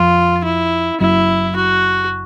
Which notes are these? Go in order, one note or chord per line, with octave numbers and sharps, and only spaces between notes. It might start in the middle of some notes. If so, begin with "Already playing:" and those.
Already playing: F2 F4
E4
F#1 F#2 E4
F#4